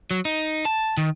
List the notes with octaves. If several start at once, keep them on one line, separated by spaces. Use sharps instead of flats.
F#3
D#4
A5
D#3